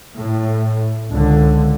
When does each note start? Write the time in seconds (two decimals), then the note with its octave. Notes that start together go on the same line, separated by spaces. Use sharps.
0.17 A2
1.10 C#2 D3